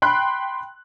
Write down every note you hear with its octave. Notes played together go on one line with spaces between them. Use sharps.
G5 B5 C6 F#6